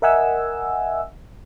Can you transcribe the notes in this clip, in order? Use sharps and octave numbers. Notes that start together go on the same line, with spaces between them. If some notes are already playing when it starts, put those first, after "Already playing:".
A#4 D#5 E5 F#5 G#5 E6